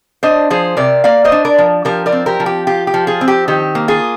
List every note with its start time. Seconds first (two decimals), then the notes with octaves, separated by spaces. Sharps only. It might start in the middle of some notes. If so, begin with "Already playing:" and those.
0.23 D4 C5 D#5
0.50 F3 G#4 C5
0.77 C3 A#4 D5
1.04 A#3 D5 F5
1.24 C5 D#5
1.32 D4
1.45 A#4 D5
1.58 F3
1.85 F3 G4 A#4
2.06 A#4 D5
2.12 C4
2.26 G4 A#4
2.40 F3
2.46 G4
2.67 F4 G4
2.87 G4
2.94 F3
3.07 F4 G#4
3.21 C4
3.28 G4
3.48 D#3 G4
3.75 A#3
3.88 F4 G#4